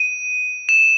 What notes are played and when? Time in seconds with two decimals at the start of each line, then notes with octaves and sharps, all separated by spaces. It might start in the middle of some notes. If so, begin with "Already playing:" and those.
Already playing: D#7
0.69 E7